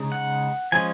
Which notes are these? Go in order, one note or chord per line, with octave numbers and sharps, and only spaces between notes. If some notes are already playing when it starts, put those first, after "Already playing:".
Already playing: C#3 G#3 D#4
F#5
F3 G#3 C#4 G#5